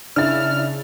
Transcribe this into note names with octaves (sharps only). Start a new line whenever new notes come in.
C#3 D4 E4 F6 A6